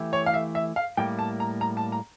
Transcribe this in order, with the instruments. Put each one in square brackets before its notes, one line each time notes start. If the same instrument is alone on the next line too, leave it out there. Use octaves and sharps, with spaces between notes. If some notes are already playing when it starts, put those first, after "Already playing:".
Already playing: [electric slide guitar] E3 A3 E4 G4
[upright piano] C#5
F5
E5
E5
F5
[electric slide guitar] A2 G3 A#3 [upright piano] G5
[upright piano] A5
A#5
A#5
A5
A#5